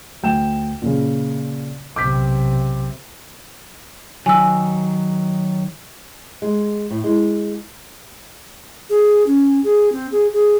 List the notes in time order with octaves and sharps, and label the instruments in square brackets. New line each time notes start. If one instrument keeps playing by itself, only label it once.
[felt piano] D2 G5 E7
A#2 C#3
[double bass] B1 C3 [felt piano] D6 G6 B6
[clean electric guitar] D#3 F#3 [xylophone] G#5 E6
[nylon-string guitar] G#3
A2
G#3
[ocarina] G#4
C#4
G#4
C4
G#4
G#4